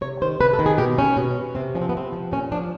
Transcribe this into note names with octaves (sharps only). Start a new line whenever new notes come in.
C3 C#5
D#3 C5
C3 B4
A4
D#3
G#4
B2 G4
C#4
B2
C3 C4
F3 C#4
C4
B3
C3 C4
F3
A#2 C#4
F3 D4